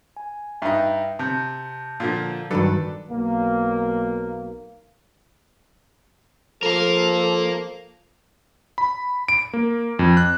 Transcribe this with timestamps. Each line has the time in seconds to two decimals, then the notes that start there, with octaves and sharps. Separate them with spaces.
0.17 G#5
0.62 G2 D#4 E5 G5 A#5
1.19 C3 A5 G6
2.00 A#2 D3 F3
2.51 G2 D#3 F#3 D4 A4 B4
3.11 B1 A#3
6.63 F3 A4 A#4 F5
8.78 B5
9.28 D7
9.53 A#3
9.99 F2
10.17 F#6